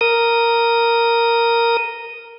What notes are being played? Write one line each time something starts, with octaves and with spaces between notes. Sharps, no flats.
A#4 D#6